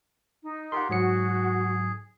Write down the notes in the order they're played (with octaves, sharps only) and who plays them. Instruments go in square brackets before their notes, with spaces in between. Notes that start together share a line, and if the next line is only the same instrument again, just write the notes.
[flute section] D#4
[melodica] F4 G4 A#4 [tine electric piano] F#5 C6
[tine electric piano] G#2 F#3 C#7 [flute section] F#4 [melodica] G#4